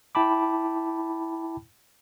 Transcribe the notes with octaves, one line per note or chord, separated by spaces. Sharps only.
E4 G5 A5 B5 D6